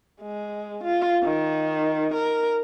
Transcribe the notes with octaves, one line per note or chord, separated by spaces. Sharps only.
G#3
F4
D#3
A#4